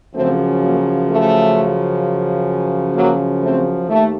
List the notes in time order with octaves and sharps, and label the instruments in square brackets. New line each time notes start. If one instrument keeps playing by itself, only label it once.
[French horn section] F#2 C#3 F3 A3 C4
F#3 A#3
A3
F#3 A#3
A3 C4
D#2 A3